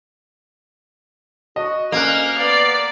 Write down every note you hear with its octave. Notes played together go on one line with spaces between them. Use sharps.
F#4 D#5
D2 A#3 C#4 D#5 F6 F#6
B3 D5 F5